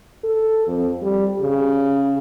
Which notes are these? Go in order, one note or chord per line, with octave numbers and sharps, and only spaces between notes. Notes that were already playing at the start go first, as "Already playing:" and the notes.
A4
F2
G3
C#3